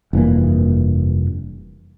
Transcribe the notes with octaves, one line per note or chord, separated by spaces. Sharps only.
F1 G2 E3 A#3